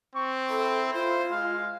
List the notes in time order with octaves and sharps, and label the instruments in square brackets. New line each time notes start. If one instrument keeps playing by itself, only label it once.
[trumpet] C4 [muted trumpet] C#6
[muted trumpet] E4 [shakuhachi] A4
[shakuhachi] F4 [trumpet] C5
[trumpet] G#3 [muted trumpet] F5